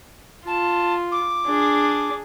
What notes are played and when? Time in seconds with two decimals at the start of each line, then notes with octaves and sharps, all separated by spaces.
0.47 F4 A5
1.11 D6
1.46 D4 G#4